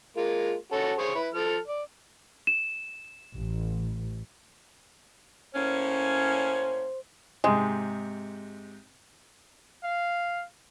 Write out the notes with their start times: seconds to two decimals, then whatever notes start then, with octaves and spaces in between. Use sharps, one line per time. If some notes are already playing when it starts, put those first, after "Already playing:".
0.17 G#3 A#3 F4
0.72 C#4 F#4 A4
0.98 G#4 C5 C#5
1.15 E4 B4
1.34 F3 A4 F6
1.68 D5
2.47 E7
3.34 A1
5.55 A2 A#3 C#4 C5
7.44 G#2 C3 G#3
9.83 F5